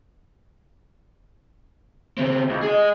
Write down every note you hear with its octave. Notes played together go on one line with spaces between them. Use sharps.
C#3 C4
C#2
G#4 D#5